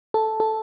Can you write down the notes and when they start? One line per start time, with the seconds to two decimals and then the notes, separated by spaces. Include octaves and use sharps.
0.14 A4
0.40 A4